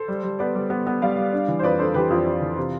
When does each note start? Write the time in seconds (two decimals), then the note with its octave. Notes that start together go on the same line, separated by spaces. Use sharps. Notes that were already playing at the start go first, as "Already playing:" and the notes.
Already playing: A4 C5
0.08 G3
0.23 G3
0.39 B3 B4 D5
0.55 G3
0.70 B3
0.87 B3
1.02 G3 D5 F5
1.17 G3
1.32 D4
1.48 E3
1.59 C5
1.63 F2 B4 D5
1.79 D4 A4 C5
1.94 E3 G4 B4
2.10 F2 F4
2.26 F2
2.42 E3
2.57 C3